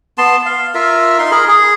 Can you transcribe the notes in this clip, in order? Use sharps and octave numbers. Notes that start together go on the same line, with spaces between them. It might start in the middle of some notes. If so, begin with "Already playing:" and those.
B3 A5 C6
F5
F4 A#4 E5
D#4 C6
G#4 A#4 B5
G#4